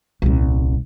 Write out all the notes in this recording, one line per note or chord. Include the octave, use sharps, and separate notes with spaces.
D#1 C2